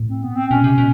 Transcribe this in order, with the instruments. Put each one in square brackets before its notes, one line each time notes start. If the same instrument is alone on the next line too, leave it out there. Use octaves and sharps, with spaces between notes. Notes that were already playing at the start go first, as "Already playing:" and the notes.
Already playing: [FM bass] A2
[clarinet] C4
B3
C4
[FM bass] B2 [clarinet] C#4
[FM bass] C3
B2